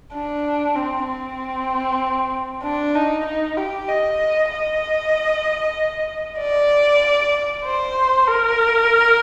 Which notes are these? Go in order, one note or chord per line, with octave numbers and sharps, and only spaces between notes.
D4
C4
C4
D4
D#4
D#4
G4
D#5
D#5
D5
C5
A#4